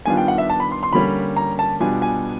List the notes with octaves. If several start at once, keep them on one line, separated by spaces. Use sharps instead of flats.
D#3 G3 B3 D4 F4 G#5
G5
F#5
E5
A5
B5
C6
C6
D3 G3 A#3 C#4 B5
A#5
A5
B2 G3 B3 D4 F4 G#5
G#5